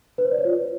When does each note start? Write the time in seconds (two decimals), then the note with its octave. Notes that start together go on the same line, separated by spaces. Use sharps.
0.18 B4
0.25 C5
0.32 D5
0.38 C#5
0.45 F4